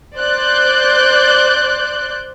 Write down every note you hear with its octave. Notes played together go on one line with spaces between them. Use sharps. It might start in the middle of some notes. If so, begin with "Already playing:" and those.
C5 D5 F#6 G6